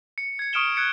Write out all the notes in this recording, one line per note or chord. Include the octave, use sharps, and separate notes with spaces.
C#7
G#6 C#7
C#6 D#6 F6 D7 E7 G7
F#6 G#6 C#7